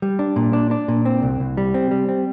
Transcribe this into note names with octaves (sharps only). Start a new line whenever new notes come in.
G3
D4
A#2
D4
D4
A#2
C4
C2
C2
G3
C4
G3
C4